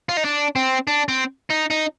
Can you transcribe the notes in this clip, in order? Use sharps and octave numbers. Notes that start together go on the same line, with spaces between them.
F4
D#4
D4
C4
D4
C4
D#4
D#4